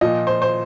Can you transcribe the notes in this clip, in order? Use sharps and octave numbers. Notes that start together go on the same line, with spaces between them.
A#2 F3 D#5
C5
C5